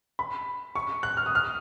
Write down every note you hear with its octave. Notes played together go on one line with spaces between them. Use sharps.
B5
C#6
F#6
F6
D#6
F6